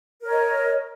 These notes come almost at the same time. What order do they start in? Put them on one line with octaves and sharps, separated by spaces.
A#4 C#5 D#5